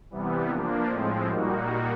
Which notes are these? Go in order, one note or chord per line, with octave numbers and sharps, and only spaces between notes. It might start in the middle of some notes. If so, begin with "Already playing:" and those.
C3 E3 G3 B3
F3 A#3 D4
A2 F3 G#3 C4
A#2 G3 A#3 D#4 F#4